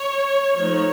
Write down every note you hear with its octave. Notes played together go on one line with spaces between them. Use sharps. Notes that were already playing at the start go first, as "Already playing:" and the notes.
Already playing: C#5
F3 A3 D#4 C#5